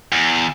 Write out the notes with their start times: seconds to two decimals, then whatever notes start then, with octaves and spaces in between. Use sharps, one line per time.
0.12 E2